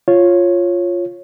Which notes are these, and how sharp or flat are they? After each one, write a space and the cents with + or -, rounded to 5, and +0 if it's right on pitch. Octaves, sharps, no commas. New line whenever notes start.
F4 +0 C#5 -10